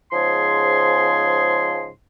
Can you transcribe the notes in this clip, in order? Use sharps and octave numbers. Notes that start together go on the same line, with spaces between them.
G#2 C#3 F3 G#4 C6